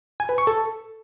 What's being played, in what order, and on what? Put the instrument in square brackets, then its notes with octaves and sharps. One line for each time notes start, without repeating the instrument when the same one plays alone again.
[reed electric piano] G#5
B4
C#6
A4